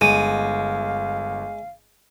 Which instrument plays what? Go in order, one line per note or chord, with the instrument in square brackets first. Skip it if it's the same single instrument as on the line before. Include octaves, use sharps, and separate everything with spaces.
[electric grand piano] G1 [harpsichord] G#3 [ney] F5 [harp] D#7